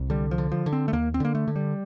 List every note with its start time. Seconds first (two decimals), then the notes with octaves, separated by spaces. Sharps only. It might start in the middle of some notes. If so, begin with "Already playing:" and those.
Already playing: C2
0.10 D3 G3
0.31 F3
0.38 D3
0.52 F3
0.66 D3
0.73 C4
0.88 A3
0.93 D#2 A#3
1.14 C4
1.20 D3 A#3
1.35 A3
1.48 D3
1.56 G3